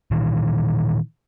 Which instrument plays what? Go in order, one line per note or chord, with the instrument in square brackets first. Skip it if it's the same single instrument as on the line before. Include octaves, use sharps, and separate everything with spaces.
[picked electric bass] A#2 D#3 E3